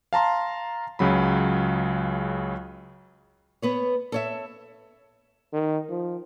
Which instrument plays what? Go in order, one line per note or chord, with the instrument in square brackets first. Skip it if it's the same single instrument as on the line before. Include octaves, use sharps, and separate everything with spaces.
[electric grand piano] F5 A5 A#5 C6
C#2 C#3 F#3 B5
[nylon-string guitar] B3 B4 C#5
A4 C#5 E5
[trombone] D#3
F3